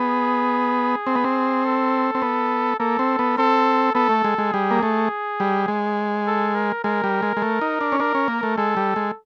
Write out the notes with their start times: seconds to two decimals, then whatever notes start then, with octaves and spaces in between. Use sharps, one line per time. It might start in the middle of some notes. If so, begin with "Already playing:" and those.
Already playing: B3 G#4
1.07 C4
1.16 B3
1.24 C4
1.65 A4
2.15 C4
2.22 B3
2.80 A#3 A4
2.99 C4
3.19 B3
3.37 C4 A4
3.95 B3 A4
4.09 A3
4.24 G#3
4.38 G#3
4.53 G3 G#4
4.71 A#3
4.83 A3
5.40 G3
5.68 G#3
6.27 A4
6.55 A#4
6.84 G#3 A#4
7.04 G3
7.22 G#3
7.37 G#3
7.42 A3
7.61 D#4
7.81 D4
7.92 C#4
8.00 D4 A#4
8.15 C#4
8.28 A#3
8.43 A3
8.57 G#3 A4
8.77 G3
8.96 G#3